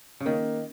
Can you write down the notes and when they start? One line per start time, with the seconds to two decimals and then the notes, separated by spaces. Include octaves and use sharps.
0.20 C#3
0.26 D#3 A#3